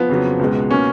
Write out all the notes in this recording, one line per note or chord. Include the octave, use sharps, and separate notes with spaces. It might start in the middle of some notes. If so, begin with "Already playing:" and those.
Already playing: F3 B3
F2 C#3 F#3
C#2 B2 G#3
B2 A#3 C#4